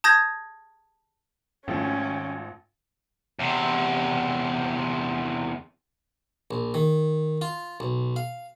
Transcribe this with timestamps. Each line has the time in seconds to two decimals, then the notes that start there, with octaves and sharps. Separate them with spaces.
0.04 A5 D#6 G6 G#6 A#6
1.68 G#1 G#2 F3 A3 C#4 G5
3.39 E2 C3
6.51 A#1
6.74 D#3
7.41 F4
7.80 B1
8.16 F5